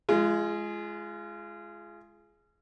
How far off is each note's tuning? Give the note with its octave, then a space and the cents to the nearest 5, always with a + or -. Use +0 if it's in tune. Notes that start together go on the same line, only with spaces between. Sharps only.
G#3 +15 F4 -30